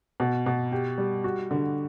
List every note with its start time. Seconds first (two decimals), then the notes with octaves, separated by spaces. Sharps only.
0.20 B2
0.46 B2
0.72 G4
0.98 G3
1.24 F#4
1.51 D3